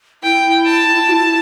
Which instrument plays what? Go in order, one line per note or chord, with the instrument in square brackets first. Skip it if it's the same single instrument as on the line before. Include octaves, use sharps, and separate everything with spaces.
[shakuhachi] E4 [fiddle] G5
[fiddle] A5
[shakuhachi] F#4
E4